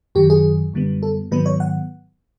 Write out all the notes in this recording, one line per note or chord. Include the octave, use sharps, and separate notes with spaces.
F#2 D#3 F#3 G4
G#4
F#2 D3 G3 B3
A4
G#2 D#3 F#3 B3 B4
C#5
F#5